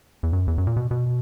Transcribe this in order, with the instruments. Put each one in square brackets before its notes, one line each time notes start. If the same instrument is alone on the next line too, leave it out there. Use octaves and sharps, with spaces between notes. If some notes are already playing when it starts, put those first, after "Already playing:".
[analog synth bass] E2
F#2
E2
F#2
A#2
B2
B2